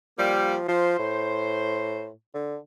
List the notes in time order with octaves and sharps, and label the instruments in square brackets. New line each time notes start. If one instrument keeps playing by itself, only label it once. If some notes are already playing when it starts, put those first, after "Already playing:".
[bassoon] F3 [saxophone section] G3 A#3
[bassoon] F3 [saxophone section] C5
[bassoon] A2
D3